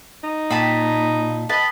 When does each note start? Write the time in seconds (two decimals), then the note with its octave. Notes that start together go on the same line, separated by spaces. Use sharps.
0.24 D#4
0.51 A#2 A5 B5
1.49 B4 D#5 A5